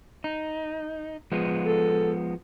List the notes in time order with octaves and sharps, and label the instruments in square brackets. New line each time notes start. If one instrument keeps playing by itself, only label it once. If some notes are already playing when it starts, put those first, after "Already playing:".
[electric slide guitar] D#4
F3 G#3 B3
[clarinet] A4